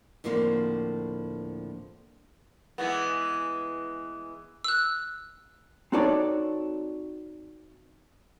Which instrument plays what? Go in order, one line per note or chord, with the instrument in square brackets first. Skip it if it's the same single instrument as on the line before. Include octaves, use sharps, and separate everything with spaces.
[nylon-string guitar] D2 A2 F3 A#3 C4
[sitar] E3 G#3 B3
[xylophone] E6 F#6
[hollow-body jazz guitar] C4 D#4 F#4 A4 C#5 D5